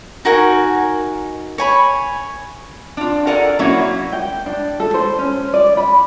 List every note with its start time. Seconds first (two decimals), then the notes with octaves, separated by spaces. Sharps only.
0.25 D#4 F#4 A#4 G#5
1.58 C#5 G#5 B5
2.97 D4 F4
3.27 A4 A#4 D5 F#5 G#5 A#5
3.59 F#3 A#3 C#4 E4 F#4
4.13 G5
4.46 D4
4.80 A4
4.94 C5
5.19 C#4
5.54 D5
5.77 B5